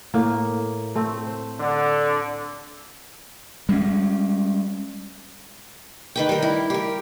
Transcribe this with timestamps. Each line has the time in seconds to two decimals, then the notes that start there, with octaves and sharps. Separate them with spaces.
0.14 A2 A#3
0.95 A3 C4
1.27 C5
1.58 D3
3.69 G3 G#3 A#3 C#4
6.16 D#3 B4 G5
6.29 G3 A#4
6.42 E4
6.70 G4 A#4